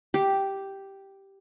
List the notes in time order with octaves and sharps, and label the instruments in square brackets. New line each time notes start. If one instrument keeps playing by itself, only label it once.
[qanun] G4